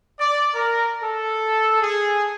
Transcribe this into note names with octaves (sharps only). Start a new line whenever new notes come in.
D5
A#4
A4
G#4